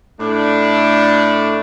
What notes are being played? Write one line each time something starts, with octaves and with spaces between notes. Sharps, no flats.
A2 A3 D4